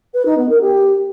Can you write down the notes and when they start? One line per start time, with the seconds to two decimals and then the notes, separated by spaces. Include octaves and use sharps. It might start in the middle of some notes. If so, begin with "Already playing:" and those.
0.13 B4
0.25 D#4
0.37 B3
0.49 A#4
0.60 G4